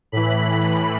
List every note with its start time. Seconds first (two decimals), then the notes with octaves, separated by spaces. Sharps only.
0.12 A2 E3 B5